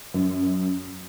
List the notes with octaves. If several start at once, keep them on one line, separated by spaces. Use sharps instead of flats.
F#2